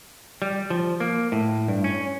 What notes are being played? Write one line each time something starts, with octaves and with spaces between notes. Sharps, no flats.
G3
F3
A#3
A2
G2
C#4